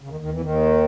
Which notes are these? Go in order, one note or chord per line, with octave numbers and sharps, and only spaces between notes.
C#3
D#2 D#3
D#2 D#3
E2 E3
D#2 D#3